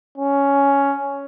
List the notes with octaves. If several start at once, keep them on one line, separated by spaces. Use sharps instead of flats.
C#4